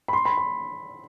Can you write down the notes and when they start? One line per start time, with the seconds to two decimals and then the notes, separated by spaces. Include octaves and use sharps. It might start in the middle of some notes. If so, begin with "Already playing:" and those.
0.08 B5
0.13 C6
0.25 B5
0.37 C6